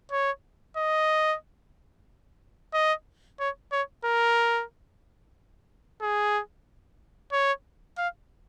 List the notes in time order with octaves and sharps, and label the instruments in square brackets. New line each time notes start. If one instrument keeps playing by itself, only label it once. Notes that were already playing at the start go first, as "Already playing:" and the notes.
[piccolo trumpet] C#5
D#5
D#5
C#5
C#5
A#4
G#4
C#5
F5